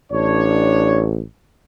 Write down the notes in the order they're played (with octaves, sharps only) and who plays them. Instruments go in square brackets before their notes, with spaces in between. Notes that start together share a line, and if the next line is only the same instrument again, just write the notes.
[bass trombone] A1 [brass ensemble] D4 C#5